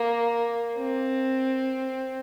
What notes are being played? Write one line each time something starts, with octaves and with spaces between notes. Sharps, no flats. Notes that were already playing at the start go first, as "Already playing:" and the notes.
Already playing: A#3
C4